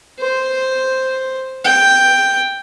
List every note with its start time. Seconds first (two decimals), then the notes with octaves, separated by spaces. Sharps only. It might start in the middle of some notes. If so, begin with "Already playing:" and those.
0.19 C5
1.64 G5